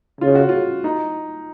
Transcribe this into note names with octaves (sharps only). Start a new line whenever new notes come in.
C#3 F4
F#4
F4
D#4